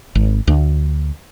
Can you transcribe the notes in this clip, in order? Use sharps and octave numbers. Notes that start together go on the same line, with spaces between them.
G#1
D2